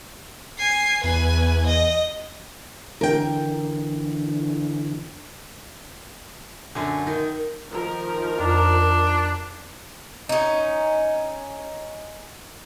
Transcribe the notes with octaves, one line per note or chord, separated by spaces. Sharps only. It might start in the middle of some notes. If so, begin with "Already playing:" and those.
G#5 C7
E2 B4 G#5
D#5
D3 E3 A#4 G5
F#2 D3 G#5
D#3 A#4
D#3 F3 A#4
F2 D4
C#4 D#4